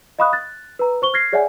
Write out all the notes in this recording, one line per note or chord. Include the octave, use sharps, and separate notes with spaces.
D#5 F5 B5 C#6 D#6 F#6
F#6 A6
B4 A#5
C5 C#6 G7
F6 G#6 A#6 C7
G#4 C#5 D5 E5 F#5 G#5